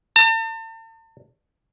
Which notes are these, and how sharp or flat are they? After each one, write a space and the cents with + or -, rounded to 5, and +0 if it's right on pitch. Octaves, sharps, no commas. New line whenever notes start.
A5 +40